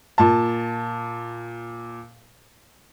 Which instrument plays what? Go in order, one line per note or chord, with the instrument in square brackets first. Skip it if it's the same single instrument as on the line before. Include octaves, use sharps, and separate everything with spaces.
[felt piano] A#2 A5